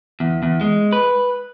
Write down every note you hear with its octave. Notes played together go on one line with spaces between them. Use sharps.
E2
E2
G#3
B4